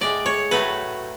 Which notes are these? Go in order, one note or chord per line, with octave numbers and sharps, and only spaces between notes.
A2 G#3 D5
C#5
A2 F#3 A3 B4